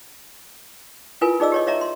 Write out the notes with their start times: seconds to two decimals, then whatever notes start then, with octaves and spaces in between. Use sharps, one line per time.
1.21 E4 F4 A#4 B4 G#5
1.40 D#4 G#4 D5 D#5 E6
1.52 G4 C#5 D#5
1.67 C#5 D#5 E5 A#5
1.81 C6